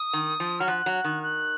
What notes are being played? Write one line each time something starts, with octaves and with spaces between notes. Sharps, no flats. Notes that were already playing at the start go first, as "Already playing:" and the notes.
Already playing: D#6
D#3
F3
F#3 F6
F3 F#6
F#3
D#3
F#6